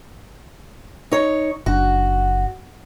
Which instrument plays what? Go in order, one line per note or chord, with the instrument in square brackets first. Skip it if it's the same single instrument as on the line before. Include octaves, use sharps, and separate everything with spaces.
[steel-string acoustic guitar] D#4 C#5
[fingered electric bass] F#1 D4 [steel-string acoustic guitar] F#4